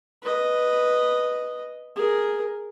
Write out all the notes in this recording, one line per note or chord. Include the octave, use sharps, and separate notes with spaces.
B4 D#5
G#4 A#4